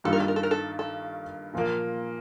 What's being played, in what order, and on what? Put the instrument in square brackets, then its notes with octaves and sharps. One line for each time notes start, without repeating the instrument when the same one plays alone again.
[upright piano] G2 D#3 G3 A#3 F4 [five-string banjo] A4
[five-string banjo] A#4
A4
A#4
A4
A#4
A4
A4
[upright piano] A#2 F3 A#3